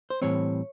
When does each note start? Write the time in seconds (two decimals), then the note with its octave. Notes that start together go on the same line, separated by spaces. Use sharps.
0.10 C5
0.22 A2 E3 G3 C4 C#5